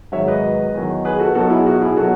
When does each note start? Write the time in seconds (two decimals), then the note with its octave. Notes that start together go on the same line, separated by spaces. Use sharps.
0.12 G#1 G#2 F#3 C#5 E5
0.27 B4 D#5
0.74 E2 D#3 F#3
1.05 G#4 B4
1.19 F#4 A4
1.35 B1 B2 F#3 F#4 A4
1.50 E4 G#4
1.66 F#4
1.81 E4 G#4
1.97 B2 F#3 F#4 A4